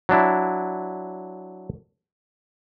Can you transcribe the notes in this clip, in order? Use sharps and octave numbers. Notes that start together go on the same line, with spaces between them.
F#3 D4 E4